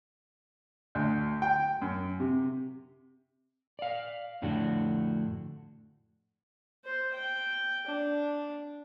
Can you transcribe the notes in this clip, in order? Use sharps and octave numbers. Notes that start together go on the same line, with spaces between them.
D2
G5
F#2
C3
D5 F5
F2 A2 D3 D4 F#4
C5
G5
D4